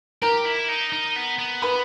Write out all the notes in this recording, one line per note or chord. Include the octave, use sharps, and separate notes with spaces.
G4 A#4 A#5
E4
D#4
D#4
B3
B3
B4 B5